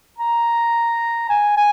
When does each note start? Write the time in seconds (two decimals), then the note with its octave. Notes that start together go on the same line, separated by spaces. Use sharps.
0.18 A#5
1.29 G#5
1.57 G#5